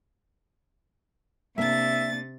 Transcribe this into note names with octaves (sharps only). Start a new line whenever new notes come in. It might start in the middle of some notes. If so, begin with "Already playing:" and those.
C3 A#3 D4 E5 A6